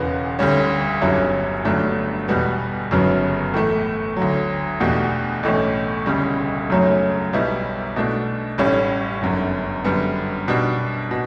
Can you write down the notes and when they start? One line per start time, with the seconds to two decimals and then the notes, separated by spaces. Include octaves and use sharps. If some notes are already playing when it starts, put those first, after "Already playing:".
Already playing: E1 E2 C#3 E3 B3
0.39 D2 D3 G3 C#4
1.02 G1 G2 F#3 C#4 E4
1.65 G1 G2 F#3 A3 D4
2.28 E2 B2 G3 B3
2.91 G1 F#2 C#3 F#3 B3
3.54 A2 E3 A3
4.17 D2 D3 F#3
4.80 E2 B2 A3 D4 G4
5.43 B1 A2 E3 A3 C#4
6.06 E1 D2 C#3 G3
6.70 F#2 C#3 F#3 A3 C#4
7.33 B1 B2 G3 B3 E4
7.96 B2 A3 D4
8.58 A1 A2 G3 C#4 E4
9.22 G1 F#2 D3
9.84 F#2 D3 G3 B3
10.48 B2 G3 D4
11.11 B2